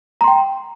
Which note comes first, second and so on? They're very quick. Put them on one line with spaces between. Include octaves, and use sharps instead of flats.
A#5 C6 G5